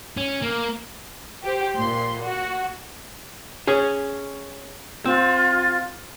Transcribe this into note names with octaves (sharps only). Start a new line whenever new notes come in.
C#4
A#3
G4 C5
A#2 C6
F#4
C#4 G#4
C4 F4